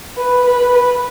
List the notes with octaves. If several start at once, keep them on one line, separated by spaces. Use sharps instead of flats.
B4
B4
B4